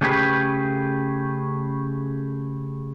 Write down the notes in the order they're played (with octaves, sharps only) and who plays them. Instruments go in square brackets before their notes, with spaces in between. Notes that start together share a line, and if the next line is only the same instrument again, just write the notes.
[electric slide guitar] C#3 A3 C#4 G4 G#4 B4